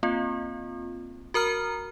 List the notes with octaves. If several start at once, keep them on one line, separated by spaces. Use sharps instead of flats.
A#3 C4 F4
F#4 A#4 A#5 F6